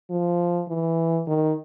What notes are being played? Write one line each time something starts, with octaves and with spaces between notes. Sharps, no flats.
F3
E3
D#3